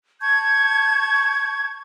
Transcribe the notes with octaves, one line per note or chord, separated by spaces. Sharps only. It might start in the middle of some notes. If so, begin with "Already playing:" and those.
A5 C#6 G6 G#6